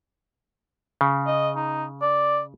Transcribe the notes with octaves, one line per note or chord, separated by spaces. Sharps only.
C#3
D#5
D#4
D5